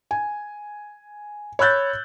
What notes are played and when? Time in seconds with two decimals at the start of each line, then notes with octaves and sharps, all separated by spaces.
0.11 G#5
1.59 C#5 B5 E6 F#6 G6 A6